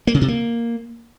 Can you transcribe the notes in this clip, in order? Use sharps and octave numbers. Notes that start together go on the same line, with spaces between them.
A#3
C#3
C3
A#3